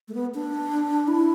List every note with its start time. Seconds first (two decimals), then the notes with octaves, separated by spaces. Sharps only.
0.08 A3
0.15 B3
0.35 D4
1.08 E4